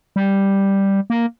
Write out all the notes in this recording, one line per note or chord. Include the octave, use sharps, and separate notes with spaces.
G3
A#3